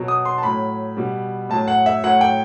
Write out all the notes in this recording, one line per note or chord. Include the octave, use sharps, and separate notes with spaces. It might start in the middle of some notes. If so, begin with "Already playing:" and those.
Already playing: B2 F#3
D#6
C6
A5
A2 F#3 B5
B2 G3
A2 F#3 A5
F#5
E5
A2 F#3 F#5
G5